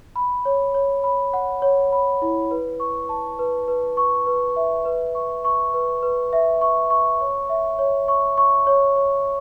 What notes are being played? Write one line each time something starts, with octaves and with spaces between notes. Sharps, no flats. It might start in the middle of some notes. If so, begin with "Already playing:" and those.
B5
C#5
C#5
B5
F#5
C#5
B5
E4
B4
C#6
A5
B4
B4
C#6
B4
E5
B4
C#6
C#6
B4
B4
E5
C#6
C#6
C#5
E5
C#5
C#6
C#6
C#5
C#5